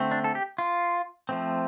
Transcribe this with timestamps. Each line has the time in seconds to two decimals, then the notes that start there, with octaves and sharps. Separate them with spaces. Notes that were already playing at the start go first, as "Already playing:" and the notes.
Already playing: D3 A3 C4
0.11 D4
0.24 A4
0.35 G4
0.58 F4
1.29 F3 A3 C4